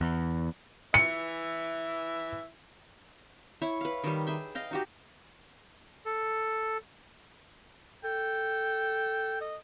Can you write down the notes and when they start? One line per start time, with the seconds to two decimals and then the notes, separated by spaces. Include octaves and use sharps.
0.01 E2
0.94 E3 E5 C#7
3.62 E4 C#5
3.81 B4 F5
4.04 D#3 G3
4.27 G#4 E5 G5
4.55 D#5 F5 G5
4.71 D#4 F#4 G4
6.05 A4
8.04 A4 G5
9.41 D#5